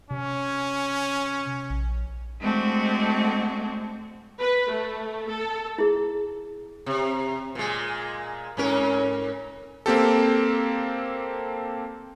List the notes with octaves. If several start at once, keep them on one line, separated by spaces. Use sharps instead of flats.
C3 C#4
A#1
G#3 A3 C4 D4 F#4
B4
A3
A4
E4 G#4
C3
A#2 G#3
G#2 C#4 A#4
A#3 C4 G4 A4